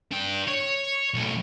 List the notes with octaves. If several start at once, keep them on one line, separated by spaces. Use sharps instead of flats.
D4 G5
C#5
B1 A2